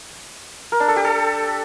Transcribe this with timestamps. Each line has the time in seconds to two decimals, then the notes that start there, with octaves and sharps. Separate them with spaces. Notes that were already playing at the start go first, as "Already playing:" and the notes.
0.72 A#4
0.80 D4
0.88 A4
0.96 G4
1.04 A4